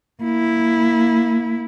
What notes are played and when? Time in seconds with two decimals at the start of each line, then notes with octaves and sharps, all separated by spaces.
0.22 A#3 E4